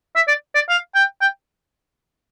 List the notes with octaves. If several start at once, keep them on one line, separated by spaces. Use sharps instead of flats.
E5
D5
D5
F5
G5
G5